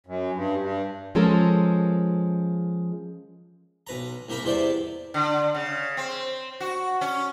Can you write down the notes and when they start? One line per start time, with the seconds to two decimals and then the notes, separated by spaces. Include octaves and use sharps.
0.07 F#2
0.35 G2
0.61 G2
1.15 F3 G#3 C#4 A4 A#4
3.87 B1 B4 A#5
4.29 C2 A#3 G4 A#4 B5
4.44 E2 C3 E4 C5 D5 G5
5.14 D3
5.55 C#3
5.97 C4
6.60 F#4
7.01 C#4